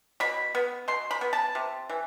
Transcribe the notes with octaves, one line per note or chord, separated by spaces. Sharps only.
B2 B5
B3
B2 C6
B5
B3
A5
C3
E3